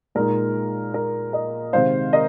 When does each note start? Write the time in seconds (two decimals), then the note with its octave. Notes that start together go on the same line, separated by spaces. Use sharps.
0.15 A#2 G#3 D#4 A#4
0.94 A#4
1.33 A#4 D#5
1.73 C3 D#3 G#3 C5 F5
2.13 A#4 D#5